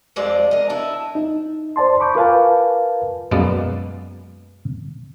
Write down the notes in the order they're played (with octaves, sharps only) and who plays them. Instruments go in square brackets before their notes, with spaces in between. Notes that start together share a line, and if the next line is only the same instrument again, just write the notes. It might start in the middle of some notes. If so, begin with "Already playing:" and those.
[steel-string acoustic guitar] F2 F3 G#3 C4 D5
A#4 D#5
D4 E4
[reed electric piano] D#4
C5 D5 A5 C6
B5 C#6 D6 G6
F4 A#4 B4 F5 G#5 A5
[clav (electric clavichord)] F#2 B2 G#3 A#3 B3 D5